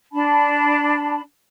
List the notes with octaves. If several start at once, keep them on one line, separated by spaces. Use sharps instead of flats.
D4 A5 B5